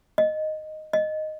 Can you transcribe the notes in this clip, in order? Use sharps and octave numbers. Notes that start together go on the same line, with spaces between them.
D#5
D#5